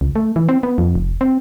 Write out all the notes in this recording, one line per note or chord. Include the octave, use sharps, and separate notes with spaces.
C#2
A3
E3
C4
B3
F2
F1
C4